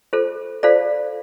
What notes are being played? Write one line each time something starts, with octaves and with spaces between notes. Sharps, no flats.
F4 A4 C5
F4 A4 C5 D5 F5